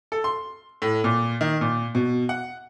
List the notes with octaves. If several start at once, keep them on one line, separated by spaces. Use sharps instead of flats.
A4
C6
A2
A#2
D#3
A#2
B2
F#5